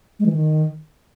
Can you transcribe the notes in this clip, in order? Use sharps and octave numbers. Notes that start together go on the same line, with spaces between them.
G#3
E3
D#3